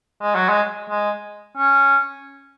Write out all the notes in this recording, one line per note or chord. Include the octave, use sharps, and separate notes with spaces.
G#3
F#3
G#3
G#3
C#4